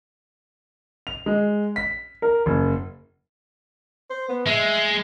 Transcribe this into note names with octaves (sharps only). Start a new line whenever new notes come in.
F7
G#3
B6
A#4
F#1
C5
B3
G#3 E5